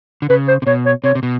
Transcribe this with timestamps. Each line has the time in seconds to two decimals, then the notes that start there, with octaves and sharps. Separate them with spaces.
0.22 D3
0.30 C#3 B4
0.48 C5
0.62 C3
0.67 B2 C#5
0.86 C#5
1.04 C3 C#5
1.15 C3
1.23 B2